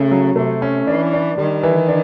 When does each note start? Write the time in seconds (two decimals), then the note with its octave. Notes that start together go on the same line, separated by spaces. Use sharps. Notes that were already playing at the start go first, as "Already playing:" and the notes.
Already playing: C#3 A3
0.11 F#3
0.36 C3 A3
0.62 C#4
0.87 E3 D4
1.13 D4
1.37 D#3 G3
1.63 E3
1.88 D4